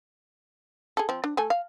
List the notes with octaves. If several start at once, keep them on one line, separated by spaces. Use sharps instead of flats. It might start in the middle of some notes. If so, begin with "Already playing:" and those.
G#4 A4
F3 C4
D4
A3 A4 G#5
F5